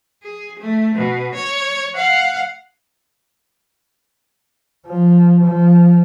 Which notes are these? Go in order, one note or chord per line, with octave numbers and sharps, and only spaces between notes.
G#4
A3
B2
C#5
F5 F#5
F3
F3